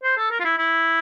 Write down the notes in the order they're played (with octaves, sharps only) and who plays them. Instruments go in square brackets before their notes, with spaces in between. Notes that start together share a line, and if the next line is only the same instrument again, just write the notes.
[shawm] C5
A4
A#4
F4
E4
E4